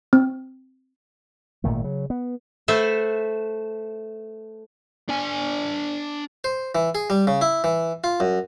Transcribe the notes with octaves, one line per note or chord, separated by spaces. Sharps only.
C4
G#1 A#2 D#3 A3
C#3 F#3
B3
A3 A4 B4 C5 E5 F#5
D4 G#5
C5
E3
G#4
G3
C#3
E4
E3
F4
F#2